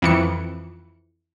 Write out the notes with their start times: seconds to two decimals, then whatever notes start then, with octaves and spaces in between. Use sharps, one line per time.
0.02 F2 E3 C#7